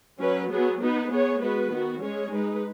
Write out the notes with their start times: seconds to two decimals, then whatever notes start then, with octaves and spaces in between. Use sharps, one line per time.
0.21 F#3 C#4 B4
0.50 F#3 B3 G#4
0.82 B3 D#4 B4
1.12 B3 G#4 C#5
1.42 G#3 B3 F#4 B4
1.73 D#3 B3 F#4
2.03 G#3 C#4 G#4 C#5
2.34 G#3 D#4 B4